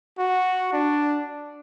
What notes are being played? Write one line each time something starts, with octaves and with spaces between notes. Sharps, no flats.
F#4
D4